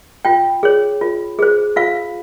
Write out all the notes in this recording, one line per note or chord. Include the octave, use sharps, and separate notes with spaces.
F4 G5
G#4 C#5
F4
G#4 C5
F4 F5